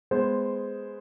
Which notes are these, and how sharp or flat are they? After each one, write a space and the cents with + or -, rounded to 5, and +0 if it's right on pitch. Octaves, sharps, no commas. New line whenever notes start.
G#3 +0 B3 +10 C5 +0